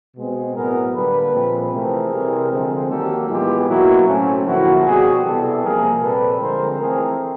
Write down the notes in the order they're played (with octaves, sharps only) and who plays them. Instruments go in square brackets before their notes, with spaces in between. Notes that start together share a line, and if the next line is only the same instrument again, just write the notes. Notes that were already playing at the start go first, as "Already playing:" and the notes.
[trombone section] B2 G#3 C4
A2 F#3 B3 G#4 A#4
D3 G3 A#3 A4 B4
A#2 F3 G#3 C4
C3 E3 A3 C4 G#4 A#4
C3 E3 G3 C4
D3 F3 G#3 C4
D#3 F#3 A#3 G4 A4
A2 E3 G#3 B3 F4 G4
B2 F#3 A#3 E4 F#4
A2 F#3 A3 C4 C#4
D3 F3 A#3 E4 F#4
B2 G3 C4 F#4 G#4
C3 E3 G3 B3 G4 A4
C3 F3 A#3 G#4 A#4
A#2 G3 C4 A4 B4
D3 F3 G#3 C4 A#4 C5
E3 A3 C4 G#4 A#4